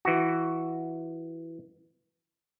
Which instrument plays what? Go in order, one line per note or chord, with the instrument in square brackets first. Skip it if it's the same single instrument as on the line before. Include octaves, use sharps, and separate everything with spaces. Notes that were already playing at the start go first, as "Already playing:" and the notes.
[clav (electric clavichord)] E3 F#4